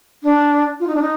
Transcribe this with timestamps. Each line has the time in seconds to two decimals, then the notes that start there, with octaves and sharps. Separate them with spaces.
0.23 D4
0.80 F4
0.87 D#4
0.95 D4
1.02 D#4